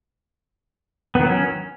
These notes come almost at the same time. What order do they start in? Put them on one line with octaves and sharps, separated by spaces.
B3 D#3 F#3 C#4